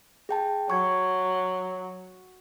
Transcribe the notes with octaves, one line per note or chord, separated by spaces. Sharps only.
G#4 G5 A5
F#3 C#6 G#6